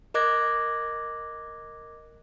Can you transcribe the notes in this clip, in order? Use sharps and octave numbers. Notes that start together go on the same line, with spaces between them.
A#4 D#5 D6 F#6 G#6 A#6